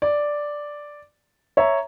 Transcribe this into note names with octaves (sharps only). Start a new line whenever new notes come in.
D5
C#5 E5 A#5